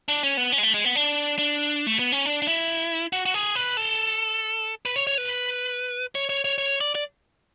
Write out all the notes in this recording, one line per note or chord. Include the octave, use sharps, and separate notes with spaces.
D4
C#4
B3
C#4
G#3
A3
G#3
B3
D4
D4
A3
B3
C#4
D4
D4
E4
F#4
F#4
G#4
B4
A4
B4
C#5
C#5
B4
C#5
C#5
C#5
C#5
D5
D5